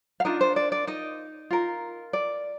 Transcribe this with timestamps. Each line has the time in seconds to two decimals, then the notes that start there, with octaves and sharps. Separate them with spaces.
0.20 F5
0.25 D4 D#4 F4 A#4 D#5
0.41 C5
0.56 D5
0.72 D5
0.87 D#4 D#5
1.50 F4 A#4
2.13 D5